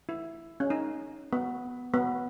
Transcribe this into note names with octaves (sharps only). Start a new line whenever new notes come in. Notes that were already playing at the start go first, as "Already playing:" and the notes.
E4
C#4
D#4
B3
B3